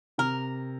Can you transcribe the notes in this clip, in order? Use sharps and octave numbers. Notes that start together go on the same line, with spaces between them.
C3 A#4